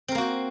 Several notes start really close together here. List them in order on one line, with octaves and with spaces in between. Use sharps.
C4 A#4 A#3 F#4 C5